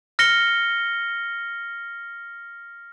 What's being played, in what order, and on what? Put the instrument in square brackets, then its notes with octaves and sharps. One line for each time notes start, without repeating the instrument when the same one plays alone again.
[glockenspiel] F6 A#6 C#7 G7